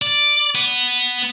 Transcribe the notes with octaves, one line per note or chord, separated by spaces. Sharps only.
D5
B3